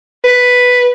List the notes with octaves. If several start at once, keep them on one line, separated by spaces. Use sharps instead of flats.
B4